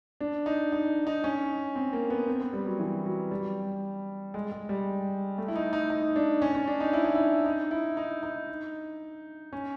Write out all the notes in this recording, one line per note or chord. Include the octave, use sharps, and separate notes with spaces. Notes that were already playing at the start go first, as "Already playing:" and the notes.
D4
D#4
D#4
D#4
C#4
C4
A#3
B3
C4
B3
G3
F#3
E3
F#3
G3
G#3
G#3
G3
A3
E4
D#4
D#4
D#4
D4
C#4
C#4
D4
D#4
E4
D#4
E4
D#4
E4
D#4
D#4
C#4